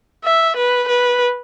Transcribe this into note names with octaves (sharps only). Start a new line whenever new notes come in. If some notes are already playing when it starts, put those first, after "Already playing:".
E5
B4
B4